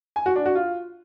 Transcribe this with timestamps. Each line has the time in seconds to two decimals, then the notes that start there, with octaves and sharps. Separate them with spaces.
0.16 G#5
0.26 F#4
0.36 D4
0.46 F#4
0.55 F4